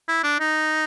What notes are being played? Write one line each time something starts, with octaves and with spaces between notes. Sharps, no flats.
E4
D4
D#4